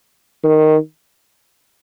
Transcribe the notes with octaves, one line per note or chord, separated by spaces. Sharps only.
D#3